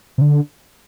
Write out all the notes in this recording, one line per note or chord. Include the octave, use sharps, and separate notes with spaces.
C3
D3